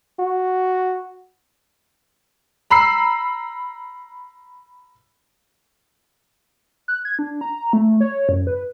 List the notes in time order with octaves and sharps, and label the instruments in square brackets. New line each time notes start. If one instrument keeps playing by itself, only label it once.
[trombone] F#4
[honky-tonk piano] A#5 B5 E6 C7
[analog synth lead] F#6
G#6
D4
A#5
A3
C#5
F#2
B4